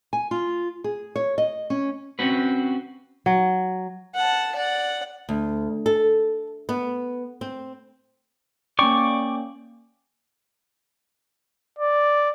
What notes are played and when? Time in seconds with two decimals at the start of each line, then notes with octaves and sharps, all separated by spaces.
0.13 G#5
0.31 F4
0.84 G#4
1.16 C#5
1.38 D#5
1.70 C#4
2.19 C4 C#4 F#4 B4
3.26 F#3
4.15 F#5 A5
4.56 D5 F#5
5.29 D2
5.86 A4
6.69 B3
7.41 C4
8.79 A#3 C#4 D5 G5 C#6
11.79 D5